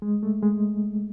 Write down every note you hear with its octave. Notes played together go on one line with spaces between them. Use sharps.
G#3
A3
G#3